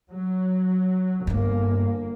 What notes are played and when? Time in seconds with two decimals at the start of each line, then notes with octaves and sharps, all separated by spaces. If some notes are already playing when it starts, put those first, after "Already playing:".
0.11 F#3
1.27 G1 G2 A3 A#3